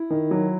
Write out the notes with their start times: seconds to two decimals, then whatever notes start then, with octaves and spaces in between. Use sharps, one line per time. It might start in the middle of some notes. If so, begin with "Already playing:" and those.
Already playing: E4
0.10 D#3
0.31 F#3